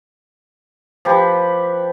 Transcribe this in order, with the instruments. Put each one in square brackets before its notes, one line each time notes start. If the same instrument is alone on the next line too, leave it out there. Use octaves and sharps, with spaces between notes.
[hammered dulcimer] F3 G4 B4